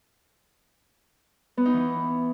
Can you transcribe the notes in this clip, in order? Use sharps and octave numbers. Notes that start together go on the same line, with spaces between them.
B3
D#4
E3